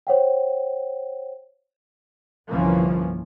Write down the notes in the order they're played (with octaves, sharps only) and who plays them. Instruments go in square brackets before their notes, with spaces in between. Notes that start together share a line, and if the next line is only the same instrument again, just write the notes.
[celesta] C5 C#5 F#5 G5
[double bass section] G1 C2 E3 F3 A#3 C#4